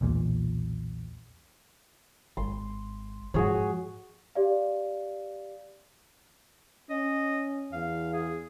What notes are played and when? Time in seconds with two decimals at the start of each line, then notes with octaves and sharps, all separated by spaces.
0.01 B1 E2 A#2
2.37 G#1 C6
3.34 G#2 F3 F#4 G#4 C#5
4.35 G4 D5 F5
6.90 C#4 D#5
7.73 E2 F5
8.13 G#4